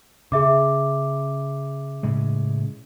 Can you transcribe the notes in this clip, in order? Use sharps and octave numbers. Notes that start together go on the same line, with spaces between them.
C#3 G#4 E5 D6
A2 C#3 G#3